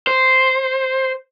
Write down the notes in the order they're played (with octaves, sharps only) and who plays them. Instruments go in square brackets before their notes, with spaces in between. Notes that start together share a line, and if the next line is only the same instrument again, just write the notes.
[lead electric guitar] C5